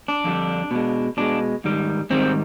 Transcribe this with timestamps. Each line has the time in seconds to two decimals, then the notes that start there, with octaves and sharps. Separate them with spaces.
0.08 D4
0.24 F2 D3 G3
0.71 B2 G#3
1.17 B2 G#3 D4
1.64 G#2 D#3 G3
2.10 G#2 D#3 G3 C4